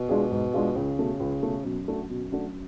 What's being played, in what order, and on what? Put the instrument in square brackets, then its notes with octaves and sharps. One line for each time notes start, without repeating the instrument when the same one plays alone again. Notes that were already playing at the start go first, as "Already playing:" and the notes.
Already playing: [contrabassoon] B2
[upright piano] G#3 D4 F4 G#4
G#2
G#3 D4 F4 G#4
[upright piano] C#2 [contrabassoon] C#3
[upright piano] B2 A3
C#2
B2 A3
[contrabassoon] F#2 [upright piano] B2
[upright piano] A3 D4 F#4
B2
A3 D4 F#4